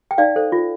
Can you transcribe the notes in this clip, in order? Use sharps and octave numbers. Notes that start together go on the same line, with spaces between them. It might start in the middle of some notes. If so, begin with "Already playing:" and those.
G5
D#4 D5 F5
A4 C5
F4